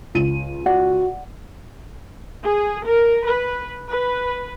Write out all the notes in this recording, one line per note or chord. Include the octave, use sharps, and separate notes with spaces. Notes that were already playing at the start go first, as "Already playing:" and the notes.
C#2 D#7
F#4 D5 F#5
G#4
A#4
B4
B4